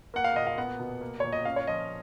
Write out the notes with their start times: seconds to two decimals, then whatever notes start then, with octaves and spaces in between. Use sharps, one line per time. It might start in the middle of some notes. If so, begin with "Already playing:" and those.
0.14 A#3 F#5
0.24 F5
0.36 A#2 D#5
0.47 F5
0.58 B3 F#5
0.80 B2
1.01 A#3
1.20 A#2 C#5
1.33 D#5
1.45 C#4 F5
1.56 C#5
1.67 F3 D#5